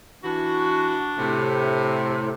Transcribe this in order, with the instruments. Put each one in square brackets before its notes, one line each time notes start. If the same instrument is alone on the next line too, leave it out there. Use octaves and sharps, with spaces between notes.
[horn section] E3 F#4 [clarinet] D4
[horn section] A2 C3